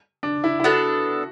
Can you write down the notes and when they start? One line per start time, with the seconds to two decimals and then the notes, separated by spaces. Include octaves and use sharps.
0.23 D4
0.44 E4
0.60 E4
0.64 B3 D4 F#4 A4